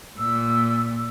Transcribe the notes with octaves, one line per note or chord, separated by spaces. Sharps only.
A#2 E6